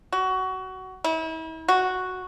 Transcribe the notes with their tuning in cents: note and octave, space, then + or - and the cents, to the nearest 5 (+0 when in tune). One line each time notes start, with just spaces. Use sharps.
F#4 +20
E4 -40
F#4 +0